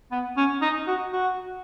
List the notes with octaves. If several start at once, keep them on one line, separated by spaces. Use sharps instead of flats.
B3
C#4
D#4
F#4
F#4